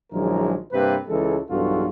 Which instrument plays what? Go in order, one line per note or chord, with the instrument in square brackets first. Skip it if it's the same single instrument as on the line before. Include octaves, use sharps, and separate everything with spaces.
[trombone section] A#1 D#3 F#3 G#3 E4 A#4
G2 C3 A#3 B4
C#2 E3 G#3 A4
B1 E2 G2 F4 F#4 A4